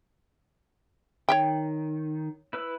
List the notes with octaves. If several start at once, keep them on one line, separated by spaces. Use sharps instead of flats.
D#3 C#5 E5 G5
E4 B4 E6